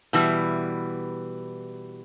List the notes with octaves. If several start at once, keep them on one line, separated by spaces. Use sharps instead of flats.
B2 E3 G3